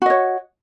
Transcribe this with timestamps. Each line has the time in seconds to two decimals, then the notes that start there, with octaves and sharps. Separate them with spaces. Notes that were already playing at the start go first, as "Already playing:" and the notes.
0.02 F#4
0.06 D#5
0.10 C#5